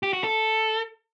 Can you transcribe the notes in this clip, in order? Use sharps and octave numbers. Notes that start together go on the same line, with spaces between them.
G4
F#4
A4